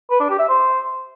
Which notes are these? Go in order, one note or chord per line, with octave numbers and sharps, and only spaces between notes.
B4
D4
G4
E5
C5